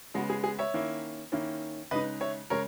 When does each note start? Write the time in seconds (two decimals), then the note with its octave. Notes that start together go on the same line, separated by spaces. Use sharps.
0.14 C#3 G#3 B3 F#4
0.30 G#4
0.44 G#4
0.59 C#5 E5
0.74 D#3 A#3 C#4 E4
1.32 D#3 A#3 C#4 E4
1.91 C#3 G#3 D#4 B4 D#5
2.21 C#5 E5
2.50 C#3 G#3 A#4 C#5